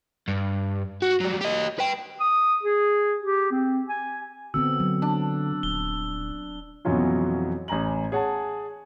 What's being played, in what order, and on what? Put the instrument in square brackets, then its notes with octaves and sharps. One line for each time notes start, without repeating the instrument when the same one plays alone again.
[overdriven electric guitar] G2
F#4
F#3 G3
G4 D#5
B4 G5
[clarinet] D#6
G#4
G4
C4
G#5
[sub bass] D3 [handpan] B3 C4 F#4 [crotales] E6
[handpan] F#3
[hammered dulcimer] D4
[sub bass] D#1 [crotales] G7
[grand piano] F2 B2 E3 F#3 C#4 F4
A1 G#5 A#5 F#7
G#4 C#5 F#5 G#5 A5